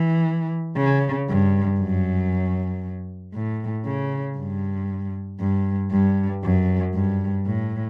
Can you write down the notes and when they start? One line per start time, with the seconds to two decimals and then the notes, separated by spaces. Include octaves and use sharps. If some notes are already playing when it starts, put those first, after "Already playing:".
Already playing: E3
0.77 C#3
1.29 G2
1.81 F#2
3.34 A2
3.85 C#3
4.38 G2
5.40 G2
5.91 G2
6.44 F#2
6.95 G2
7.46 A2